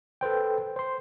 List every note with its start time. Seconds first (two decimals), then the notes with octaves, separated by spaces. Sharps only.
0.21 A4 B4 C5 G5
0.76 C5 C6